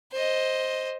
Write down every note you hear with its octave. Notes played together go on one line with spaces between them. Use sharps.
C5 D#5